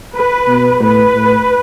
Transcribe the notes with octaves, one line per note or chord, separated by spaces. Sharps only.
B4
B2
A2 B4
A2